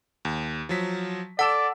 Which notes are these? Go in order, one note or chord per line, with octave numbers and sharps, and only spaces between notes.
D#2
F3 F#3 B6
A4 D5 F#5 A5 E6 E7